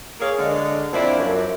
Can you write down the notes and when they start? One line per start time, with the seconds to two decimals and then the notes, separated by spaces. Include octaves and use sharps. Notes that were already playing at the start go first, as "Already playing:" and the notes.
0.20 A#3 G#4 C#5 F5
0.38 D3 G#3
0.93 F2 A#3 C4 D4 E4
1.18 F#2